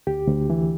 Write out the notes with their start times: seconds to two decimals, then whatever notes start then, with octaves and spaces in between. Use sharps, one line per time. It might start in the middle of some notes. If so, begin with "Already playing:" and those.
0.07 D2 G4
0.28 D2
0.50 E3